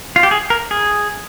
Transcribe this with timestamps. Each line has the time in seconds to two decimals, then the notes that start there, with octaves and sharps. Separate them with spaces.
0.16 F4
0.23 G4
0.31 G#4
0.50 A#4
0.71 G#4